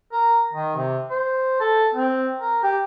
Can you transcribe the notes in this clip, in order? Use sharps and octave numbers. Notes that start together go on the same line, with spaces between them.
A#4
D#3
C3
C5
A4
C4
A#4
G4